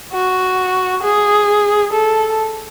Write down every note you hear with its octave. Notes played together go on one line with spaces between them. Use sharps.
F#4
G#4
A4